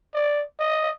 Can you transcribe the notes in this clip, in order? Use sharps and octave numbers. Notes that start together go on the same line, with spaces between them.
D5
D#5